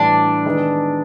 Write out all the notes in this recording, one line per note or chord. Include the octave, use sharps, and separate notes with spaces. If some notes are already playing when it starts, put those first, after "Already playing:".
Already playing: A2 E3 G3 D4
D#3 G#3 B3 D#4